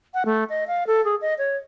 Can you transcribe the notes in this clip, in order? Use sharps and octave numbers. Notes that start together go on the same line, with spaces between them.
F#5
A3
D#5
F5
A4
G#4
D#5
C#5